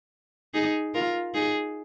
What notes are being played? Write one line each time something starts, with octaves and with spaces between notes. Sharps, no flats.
D#4 G#4
F4 A#4
D#4 G#4